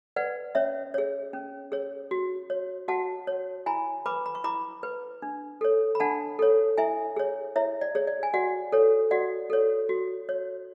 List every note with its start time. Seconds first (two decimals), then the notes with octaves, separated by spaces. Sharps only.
0.16 B4 D5 F#5
0.55 C#4 C#5 E5
0.94 G#4 C#5
1.33 C#4
1.72 G#4 C#5
2.11 F#4
2.50 C#5
2.88 F#4 F#5 A5
3.27 C#5
3.66 E4 G#5 B5
4.06 B4 B5 D6
4.26 B5
4.35 C#6
4.44 E4 B5 D6
4.83 B4
5.22 D4
5.61 A4 C#5
5.95 B5
6.00 D4 F#5 A5
6.39 A4 C#5
6.77 E4 E5 G#5
7.16 G#4 C#5
7.56 E4 C#5 E5
7.81 D5
7.95 G#4 C#5
8.07 D5
8.23 G#5
8.34 F#4 D5 F#5
8.72 A4 C#5
9.11 F#4 D5 F#5
9.50 A4 C#5
9.89 F#4
10.29 C#5